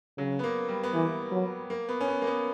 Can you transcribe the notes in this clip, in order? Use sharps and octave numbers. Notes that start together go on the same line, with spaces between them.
C#3 F#3
B3
A#3
G3
B3
E3 A#3
F#3
A#3
B3
C#4
B3
A#3
B3